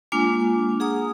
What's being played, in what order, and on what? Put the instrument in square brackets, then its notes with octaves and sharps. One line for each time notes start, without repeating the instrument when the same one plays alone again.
[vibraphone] G#3 A#3 D4 F4 G#5 D6
G#4 F#5 A#5 D#6